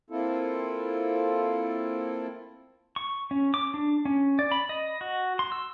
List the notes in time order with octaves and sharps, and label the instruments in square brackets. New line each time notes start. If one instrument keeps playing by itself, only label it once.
[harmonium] A#3 C4 E4 F4 A4
[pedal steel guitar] C#6
C#4
D6
D4
C#4
D5
B5
D#5
F#4
C6
E6